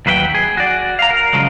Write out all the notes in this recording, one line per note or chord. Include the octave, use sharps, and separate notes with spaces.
D#2 F#3 B4 D#5 G5
G#4
F#4 D5
F5 A#5
A#4
C#3 F3 F#3 G#3